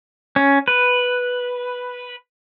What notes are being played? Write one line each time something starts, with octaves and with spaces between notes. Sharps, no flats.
C#4
B4